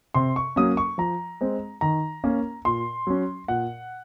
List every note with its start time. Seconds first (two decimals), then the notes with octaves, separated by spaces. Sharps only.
0.14 C3 C6
0.36 C#6
0.56 F#3 A#3 C#4 D#6
0.77 C#6
0.98 F3 A#5
1.41 G#3 C4
1.81 D#3 A#5
2.24 A#3 C#4
2.65 A#2 C6
3.07 F#3 C#4
3.48 A#2 F#5